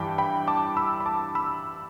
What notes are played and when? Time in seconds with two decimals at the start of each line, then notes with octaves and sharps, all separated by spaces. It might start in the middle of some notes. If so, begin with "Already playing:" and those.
Already playing: G2 E3 G5 A5 B5 D6
0.18 G5 B5
0.48 A5 D6
0.77 B5 E6
1.00 B5
1.06 A5 D6
1.35 B5 E6